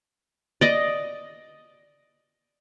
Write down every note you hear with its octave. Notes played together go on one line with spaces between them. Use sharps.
D5 D#5